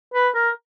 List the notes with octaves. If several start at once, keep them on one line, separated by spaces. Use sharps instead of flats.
B4
A#4